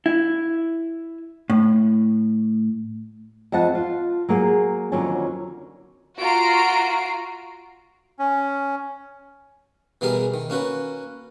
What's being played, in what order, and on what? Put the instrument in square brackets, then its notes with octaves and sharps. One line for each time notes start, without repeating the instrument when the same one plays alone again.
[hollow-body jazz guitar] E4
A2
[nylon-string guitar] F2 F3 D#5 F#5 A5
F4
F#3 A#3 G#4
F2 D3 D#3 F#3 C#4 G#5
[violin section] F4 F#4 A#5 C7 D7
[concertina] C#4
[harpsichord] B2 E3 G3 G#4 A#4
D#3
A#3 C#4 F#4 B4